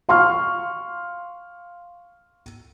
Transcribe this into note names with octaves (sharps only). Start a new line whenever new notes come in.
F5 C6 C#6 F6